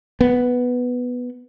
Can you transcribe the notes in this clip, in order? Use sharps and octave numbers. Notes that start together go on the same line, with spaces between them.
B3